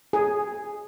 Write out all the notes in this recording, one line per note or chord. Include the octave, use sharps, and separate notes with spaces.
G#4